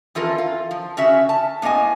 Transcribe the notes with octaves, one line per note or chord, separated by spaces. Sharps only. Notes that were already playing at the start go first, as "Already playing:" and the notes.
F2 E3 F4 A4 A#4
F4
F3
C#3 C#4 F#4 E5
A5
A2 A#3 B3 D#5 G#5